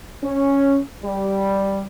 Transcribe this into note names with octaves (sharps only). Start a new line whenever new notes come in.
C#4
G3